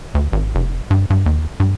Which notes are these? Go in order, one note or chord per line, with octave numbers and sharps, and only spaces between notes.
D2
G#1
F1
G2
G2
D#2
G2